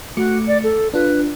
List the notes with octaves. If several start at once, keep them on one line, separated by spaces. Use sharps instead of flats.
A3 F#4 D6 C#7
D5
A4
D4 F4 B4